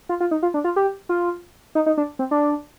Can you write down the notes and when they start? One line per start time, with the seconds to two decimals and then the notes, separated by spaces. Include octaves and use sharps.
0.09 F4
0.20 F4
0.31 D#4
0.43 F4
0.54 D4
0.64 F4
0.76 G4
1.09 F4
1.75 D#4
1.86 D#4
1.98 D4
2.19 C4
2.31 D4